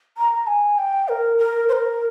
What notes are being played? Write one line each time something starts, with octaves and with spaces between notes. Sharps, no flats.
A#5
G#5
G5
A#4
A#4
C5
A#4